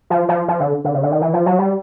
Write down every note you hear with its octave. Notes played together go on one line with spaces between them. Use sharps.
F3
F3
F3
D3
D3
C#3
D3
D#3
E3
F3
F#3
G3